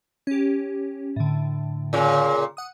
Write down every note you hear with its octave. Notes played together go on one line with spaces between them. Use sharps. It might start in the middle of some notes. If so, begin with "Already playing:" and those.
C#4 G4
A2 D3
A#2 C#3
F#5 D#6